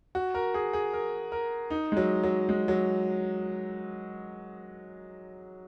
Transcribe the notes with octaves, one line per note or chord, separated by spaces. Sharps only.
F#4
A#4
G#4
G#4
A#4
A#4
D#4
G#3
F#3
F#3
G#3
F#3